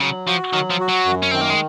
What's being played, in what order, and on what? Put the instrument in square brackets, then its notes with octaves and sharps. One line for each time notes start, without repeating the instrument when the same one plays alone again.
[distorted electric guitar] C#3 [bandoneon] F#3
[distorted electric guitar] F3 [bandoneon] F#4
[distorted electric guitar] D#3 [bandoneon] F#3
[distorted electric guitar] F3
[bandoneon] F#4
[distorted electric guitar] F#3
[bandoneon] F#2
[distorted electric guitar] C#4
[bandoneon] D#3 [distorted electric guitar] C4
[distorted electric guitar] A#3
G#3